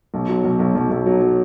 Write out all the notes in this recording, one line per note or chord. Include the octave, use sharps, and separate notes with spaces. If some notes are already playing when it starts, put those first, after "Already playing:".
B1
F#3
B1
B1
B1
B1
F#3
F#3